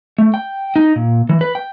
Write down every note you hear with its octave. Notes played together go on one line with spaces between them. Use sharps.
A3
G5
D#4
A#2
E3
B4
G5